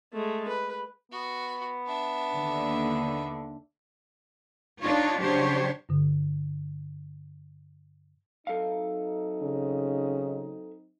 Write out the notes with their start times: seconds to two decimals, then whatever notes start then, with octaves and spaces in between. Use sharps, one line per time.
0.13 G#3 A3
0.48 B4
1.12 B3 F#4
1.87 D4 E5
2.34 D#2 D3
4.81 D4 D#4 F4 C#5
5.19 C#3 F#3 D4 G4 C5 C#5
5.89 G2 D3
8.47 F#3 C4 D#4 A4 E5 F5
9.42 C#3